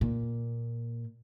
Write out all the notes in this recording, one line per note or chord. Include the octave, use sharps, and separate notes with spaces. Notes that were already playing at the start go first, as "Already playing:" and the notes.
A#2